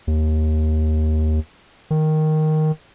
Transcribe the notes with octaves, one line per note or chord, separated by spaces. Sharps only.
D#2
D#3